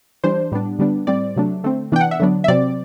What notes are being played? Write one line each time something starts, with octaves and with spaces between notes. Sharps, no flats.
E3 G3 D4 C5
A2 G3 B3 D4
D3 G3 B3 D4
A2 G3 C4 D5
C3 F#3 A3 D4
D3 A3 C4
C3 E3 B3 D4 G5
F#5
E5
D3 F#3 B3 D4
E5
C3 F#3 C4 D5